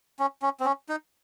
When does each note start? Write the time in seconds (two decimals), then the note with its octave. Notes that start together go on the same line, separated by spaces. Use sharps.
0.19 C#4
0.42 C#4
0.60 C4
0.65 C#4
0.89 D#4